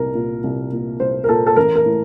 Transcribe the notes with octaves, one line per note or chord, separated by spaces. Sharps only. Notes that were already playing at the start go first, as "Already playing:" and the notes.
Already playing: C2 A#2 A#4
A#2
C2
A#2
C2 C5
A#4
A#2 A4
A4
A1 A#4
A#4
A2